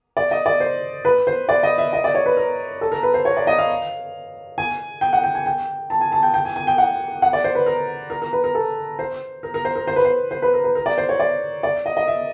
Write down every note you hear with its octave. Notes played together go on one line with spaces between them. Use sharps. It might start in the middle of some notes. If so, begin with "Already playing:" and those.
D5
D#5
D5
C5
B4
C5
D5
D#5
E5
D#5
D5
C#5
B4
A#4
A4
A#4
B4
C5
C#5
D5
D#5
F5
G#5
G5
F#5
G5
G#5
G5
A5
G#5
A5
G5
G5
G#5
G#5
G5
F#5
F#5
D5
C5
B4
A#4
A#4
A#4
B4
A#4
A4
C5
A#4
A#4
C5
A#4
C5
B4
C5
C5
B4
A#4
B4
A#4
D5
C5
C#5
D5
D5
D#5
D#5
E5